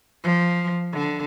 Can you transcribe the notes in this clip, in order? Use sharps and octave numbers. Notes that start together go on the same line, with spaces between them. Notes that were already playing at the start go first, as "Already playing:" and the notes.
F3
D3